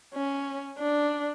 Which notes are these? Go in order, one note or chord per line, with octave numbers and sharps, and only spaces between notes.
C#4
D4